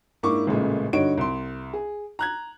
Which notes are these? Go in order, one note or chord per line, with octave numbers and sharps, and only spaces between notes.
G#2 A#3 D4 E4 C#6 D6
A1 A#2 C#3 G#3 A3
G2 D3 D#4 F#4 C#5 D7
C2 C6
G#4
A#5 F#6 G#6